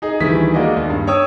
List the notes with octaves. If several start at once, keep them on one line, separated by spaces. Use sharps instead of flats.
D#4 G#4 D#5
D2 D#3 E3 G3 G#4 B6
G#3 A#3 F#4 D5 D#5
D#2
G2
C#5 G5 D#6 E6